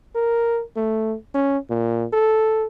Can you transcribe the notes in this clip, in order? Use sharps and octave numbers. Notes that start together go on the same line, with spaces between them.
A#4
A3
C#4
A#2
A4